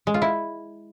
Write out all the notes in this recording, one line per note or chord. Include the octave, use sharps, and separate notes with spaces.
G#3
F4
E4